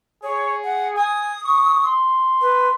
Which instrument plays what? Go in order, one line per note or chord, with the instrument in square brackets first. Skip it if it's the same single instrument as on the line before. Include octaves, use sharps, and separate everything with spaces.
[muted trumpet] G#4 [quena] C#5
[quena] F#5
[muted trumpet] G#5 [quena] D#6
[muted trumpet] C#6
C6
[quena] B4